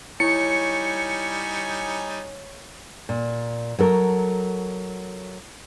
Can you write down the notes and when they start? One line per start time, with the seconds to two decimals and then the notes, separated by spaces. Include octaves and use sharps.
0.20 G3 D#4 E4 C#5 G#5 C#7
3.09 A#2
3.79 F#3 A4 A#4